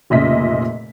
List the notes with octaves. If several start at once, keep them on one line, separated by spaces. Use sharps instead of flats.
F1 A#2 C#3 D#5 E5 B6